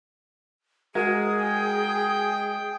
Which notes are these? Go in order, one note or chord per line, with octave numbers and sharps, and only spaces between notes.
G#3 F#4 G#4 A#4
G5